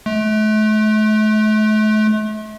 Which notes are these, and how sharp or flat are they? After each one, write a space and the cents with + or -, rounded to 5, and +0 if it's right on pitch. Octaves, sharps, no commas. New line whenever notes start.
A3 -40